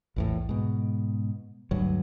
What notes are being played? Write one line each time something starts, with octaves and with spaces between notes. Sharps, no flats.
A#1 E2 A2
G#2 B2
D2 G2 F#3